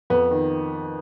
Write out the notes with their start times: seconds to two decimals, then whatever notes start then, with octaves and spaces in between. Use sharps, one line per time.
0.10 F2 B3
0.31 D#3